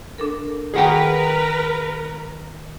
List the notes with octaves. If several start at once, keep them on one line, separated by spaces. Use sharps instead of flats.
D4 A4 A#4
D#3 G#4 A#4 B4 F#5 G5 A#5